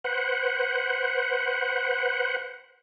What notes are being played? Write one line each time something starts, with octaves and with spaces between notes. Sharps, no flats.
B4 C5 F#5